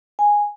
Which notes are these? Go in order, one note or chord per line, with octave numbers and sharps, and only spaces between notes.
G#5